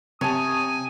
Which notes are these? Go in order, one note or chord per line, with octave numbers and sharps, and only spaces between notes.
C3 C#5 G#5 A5 D#6